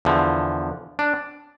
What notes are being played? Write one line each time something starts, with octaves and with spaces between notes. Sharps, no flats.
E2 D3 F3
D4